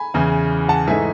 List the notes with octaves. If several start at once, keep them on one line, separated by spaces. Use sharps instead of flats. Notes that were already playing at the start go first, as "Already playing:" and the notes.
Already playing: G#5 B5
E2 C#3 E3
F#5 A5
G#2 E3 A3 D#4 E5 G#5